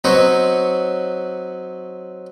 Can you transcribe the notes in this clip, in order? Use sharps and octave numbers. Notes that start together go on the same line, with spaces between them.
F#3 C4 D#4 B4 C#5